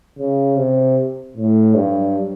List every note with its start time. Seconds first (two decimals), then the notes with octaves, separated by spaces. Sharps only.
0.18 C#3
0.58 C3
1.37 A2
1.75 G2 F#3